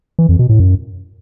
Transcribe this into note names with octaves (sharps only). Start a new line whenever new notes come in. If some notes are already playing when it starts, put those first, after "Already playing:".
E3
F2
B2
A2
F#2